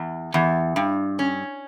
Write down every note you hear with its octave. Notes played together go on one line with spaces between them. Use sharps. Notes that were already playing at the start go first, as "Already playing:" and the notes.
Already playing: E2
E2
G2
C#4